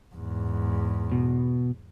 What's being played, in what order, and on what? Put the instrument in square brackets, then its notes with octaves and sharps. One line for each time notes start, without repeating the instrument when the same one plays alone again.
[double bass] E2 G#2
[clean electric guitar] B2